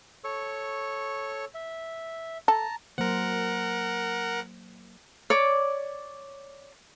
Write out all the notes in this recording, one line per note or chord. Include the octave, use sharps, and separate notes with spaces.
A4 C#5 C#6
E5
A4 A5 A#5
F#3 A#3 A#4 C5 F#5
C#5 D5 D6